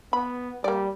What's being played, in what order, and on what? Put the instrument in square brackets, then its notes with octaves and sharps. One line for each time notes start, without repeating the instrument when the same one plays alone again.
[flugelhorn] B3 [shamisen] B5
[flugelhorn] G3 [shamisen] A#3 D5